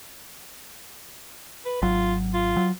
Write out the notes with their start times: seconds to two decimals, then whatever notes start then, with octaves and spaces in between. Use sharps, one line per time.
1.65 B4
1.82 G#1 F#3 F4
2.34 F4
2.57 F#3